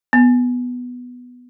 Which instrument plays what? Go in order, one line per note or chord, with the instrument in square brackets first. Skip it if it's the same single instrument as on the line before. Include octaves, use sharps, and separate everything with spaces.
[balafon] B3